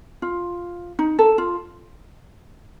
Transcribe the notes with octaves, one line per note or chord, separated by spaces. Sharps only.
F4
D#4
A4
F4